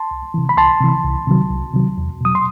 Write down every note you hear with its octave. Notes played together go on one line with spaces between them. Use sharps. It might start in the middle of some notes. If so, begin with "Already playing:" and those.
Already playing: A5 C6
C2
C3 E3
B5
C2 A5 C6
C3 E3
C2
C3 D#3 F#3
C2
C3 D#3 F#3
E2
B2 F#3 D#6
C6